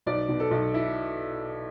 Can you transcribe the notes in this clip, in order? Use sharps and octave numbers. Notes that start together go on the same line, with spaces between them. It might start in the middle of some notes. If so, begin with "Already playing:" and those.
B1 D5
B2
A4
B1
E4